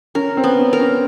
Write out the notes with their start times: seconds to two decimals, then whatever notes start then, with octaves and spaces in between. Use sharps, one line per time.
0.15 C#4 A#4
0.37 C4
0.44 B3
0.59 C#4
0.73 A#4
0.80 C#4